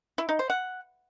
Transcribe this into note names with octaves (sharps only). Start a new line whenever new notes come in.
E4
D#4
C5
F#5